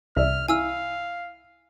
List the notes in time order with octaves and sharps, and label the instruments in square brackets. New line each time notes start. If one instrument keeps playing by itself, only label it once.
[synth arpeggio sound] C2 [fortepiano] D5 E5 [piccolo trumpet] F6
[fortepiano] E4 [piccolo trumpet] F5 [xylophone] G#5 E6 F6